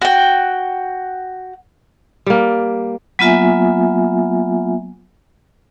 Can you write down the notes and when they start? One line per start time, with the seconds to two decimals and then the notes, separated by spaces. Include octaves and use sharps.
0.02 F#4 G5
2.26 G3 A#3
3.19 F#3 A#3 B3 F4 E5 G#5